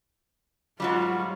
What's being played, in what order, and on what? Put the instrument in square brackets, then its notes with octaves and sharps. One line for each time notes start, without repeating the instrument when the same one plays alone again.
[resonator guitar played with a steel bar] G#2 F#3 G3 [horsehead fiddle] F4 F#4